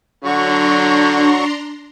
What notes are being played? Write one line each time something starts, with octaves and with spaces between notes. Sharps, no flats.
D3 F#3 D4 F#4 A#5 C6 C#6